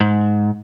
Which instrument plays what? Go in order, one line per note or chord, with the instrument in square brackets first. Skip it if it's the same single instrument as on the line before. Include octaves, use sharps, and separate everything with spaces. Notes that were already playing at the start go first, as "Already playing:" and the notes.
[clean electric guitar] G#2